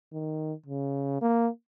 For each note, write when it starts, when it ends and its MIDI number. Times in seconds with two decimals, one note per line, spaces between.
0.13 0.53 51
0.66 1.19 49
1.21 1.48 58